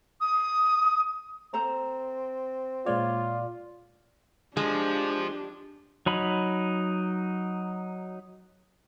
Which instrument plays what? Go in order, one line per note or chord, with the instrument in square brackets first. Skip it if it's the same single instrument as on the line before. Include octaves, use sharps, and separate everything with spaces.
[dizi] D#6
[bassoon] C4 [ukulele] A4 C5 A#5
[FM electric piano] A#2 G#3 D5 [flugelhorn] F4 [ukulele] C#5
[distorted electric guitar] F3 [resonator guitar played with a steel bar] G#3 [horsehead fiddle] D4 G4
[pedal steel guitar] F#3 D#4 B5